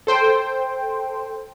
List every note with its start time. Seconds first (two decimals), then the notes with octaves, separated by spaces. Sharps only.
0.07 A4 C5 G5